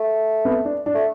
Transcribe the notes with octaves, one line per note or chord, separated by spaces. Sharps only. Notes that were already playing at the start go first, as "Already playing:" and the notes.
Already playing: A3
B3
D4
D4
A3